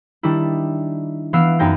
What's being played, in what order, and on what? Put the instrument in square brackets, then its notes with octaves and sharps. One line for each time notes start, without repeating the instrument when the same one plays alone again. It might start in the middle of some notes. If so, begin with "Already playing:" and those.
[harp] D#3 G3 D4 E4
E3 B3 F5 E6 C7 D7
F#2 B3 D#4 G5 A#6